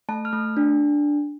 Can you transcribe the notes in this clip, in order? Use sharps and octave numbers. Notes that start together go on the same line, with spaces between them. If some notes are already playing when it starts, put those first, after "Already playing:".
A3 A5
F6
A3
D4